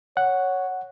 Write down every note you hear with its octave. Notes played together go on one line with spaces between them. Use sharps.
C#5 F#5